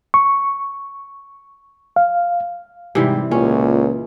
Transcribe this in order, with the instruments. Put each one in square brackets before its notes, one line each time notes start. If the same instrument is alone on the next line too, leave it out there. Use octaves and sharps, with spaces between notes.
[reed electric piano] C#6
F5
[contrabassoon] G#2 [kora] C3 E3 G3
[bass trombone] C#2 [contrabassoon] A#2 [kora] C#4